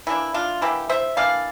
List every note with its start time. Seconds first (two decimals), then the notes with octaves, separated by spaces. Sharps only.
0.07 E3 A#3 D4 E4
0.34 D4 F4
0.61 E3 A#3 D4 E4 G4
0.89 C5 E5
1.17 E3 A#3 D4 D5 F5